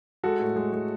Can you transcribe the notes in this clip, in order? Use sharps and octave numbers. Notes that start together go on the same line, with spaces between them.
G#3 F#4 A4
A2
G#3
G#3